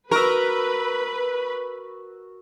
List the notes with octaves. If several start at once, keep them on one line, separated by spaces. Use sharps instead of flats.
F#4 A#4 B4 E6